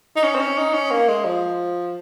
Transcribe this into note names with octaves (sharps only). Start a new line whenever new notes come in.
D#4
C#4
C4
C#4
D#4
C#4
A#3
G#3
F3